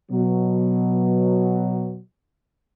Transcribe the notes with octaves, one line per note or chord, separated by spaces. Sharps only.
B2 F#3